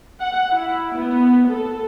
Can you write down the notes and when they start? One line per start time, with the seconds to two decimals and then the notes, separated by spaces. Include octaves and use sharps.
0.20 F#5
0.51 E4
0.99 B3
1.50 A4